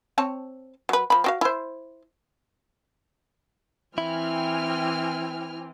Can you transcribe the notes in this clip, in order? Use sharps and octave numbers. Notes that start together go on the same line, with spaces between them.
C4 C#5 A5
F#3 B4
F3 B5
C4 F#4 F5
E4 C5
E3 C4 E4 G5 G#5 F6